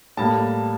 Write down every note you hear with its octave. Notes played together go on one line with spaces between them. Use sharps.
A2 G3 A#3 A5